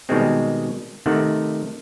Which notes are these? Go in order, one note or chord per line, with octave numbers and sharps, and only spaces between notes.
B2 D#3 G3 G#3 C4
C3 D#3 A3 F#5